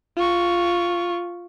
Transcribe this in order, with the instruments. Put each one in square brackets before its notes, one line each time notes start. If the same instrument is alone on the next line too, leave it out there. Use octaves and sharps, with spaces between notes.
[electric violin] F4 C#6